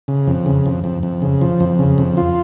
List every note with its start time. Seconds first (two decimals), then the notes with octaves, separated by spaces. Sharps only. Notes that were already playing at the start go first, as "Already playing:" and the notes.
0.08 C#3
0.27 F2
0.46 C#3
0.66 F2
0.84 F2
1.03 F2
1.22 C#3
1.41 F3
1.60 F2
1.79 C#3
1.98 F2
2.17 F4